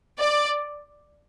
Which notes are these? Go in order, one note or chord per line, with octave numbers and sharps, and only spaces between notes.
D5